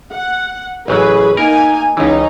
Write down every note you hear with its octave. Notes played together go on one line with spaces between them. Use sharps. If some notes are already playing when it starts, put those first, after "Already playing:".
F#5
A1 C#3 F#3 G#4 B4
A#3 D#4 A#4 G#5
C#2 E3 C#4 D#4